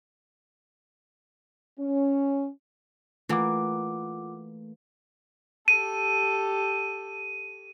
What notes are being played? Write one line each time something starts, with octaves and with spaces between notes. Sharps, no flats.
C#4
E3 A3 A#3 F4 F#5 D6
G4 A4 D#7